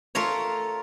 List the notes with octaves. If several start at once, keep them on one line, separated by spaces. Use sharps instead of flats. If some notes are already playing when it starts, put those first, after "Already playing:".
A3 F4 A#4 C#5